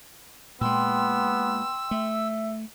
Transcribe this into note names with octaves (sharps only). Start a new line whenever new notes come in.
A#2 G#3 B3 G5 C6 E6
A3 E5